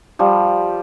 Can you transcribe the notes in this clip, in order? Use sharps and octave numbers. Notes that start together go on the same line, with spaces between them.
F3 G3